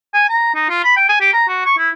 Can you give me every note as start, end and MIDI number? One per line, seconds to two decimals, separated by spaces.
0.14 0.26 80
0.29 0.54 82
0.55 0.65 63
0.69 0.83 65
0.84 0.96 83
0.97 1.08 79
1.09 1.19 80
1.21 1.32 67
1.33 1.45 82
1.48 1.61 66
1.66 1.73 85
1.78 1.90 64